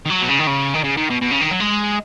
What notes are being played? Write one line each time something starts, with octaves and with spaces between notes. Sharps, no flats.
D#3
F#3
B2
C#3
D#3
C#3
D#3
C#3
D#3
B2
B2
C#3
D#3
F#3
G#3